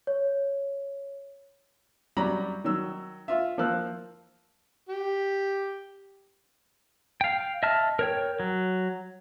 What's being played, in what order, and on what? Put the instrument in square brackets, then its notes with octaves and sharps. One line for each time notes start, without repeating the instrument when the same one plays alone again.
[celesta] C#5
[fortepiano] F#2 F#3 G3 D5 A#5 B5
D#3 F#3 E6
F4 E5
F3 A#3 C5 F5 E6 F#6
[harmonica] G4
[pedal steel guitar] F5 G5
D#5 E5 A5 F6
A#4 C#5 G5
F#3